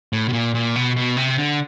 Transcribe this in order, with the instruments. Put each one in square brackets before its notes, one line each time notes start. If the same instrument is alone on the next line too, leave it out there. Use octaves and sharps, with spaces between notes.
[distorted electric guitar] A2
B2
A#2
A#2
B2
B2
C3
D3